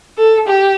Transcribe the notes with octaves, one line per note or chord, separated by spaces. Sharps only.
A4
G4